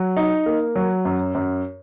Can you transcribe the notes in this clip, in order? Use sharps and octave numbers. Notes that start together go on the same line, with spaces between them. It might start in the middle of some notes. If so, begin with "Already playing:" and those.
Already playing: F#3
D#4
A#3
F#3
F#2
F#2